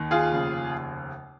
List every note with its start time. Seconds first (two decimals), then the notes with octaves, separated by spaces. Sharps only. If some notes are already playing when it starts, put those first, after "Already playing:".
Already playing: D#2 D#3
0.11 F4 G#4
0.30 F1 D#2 C#3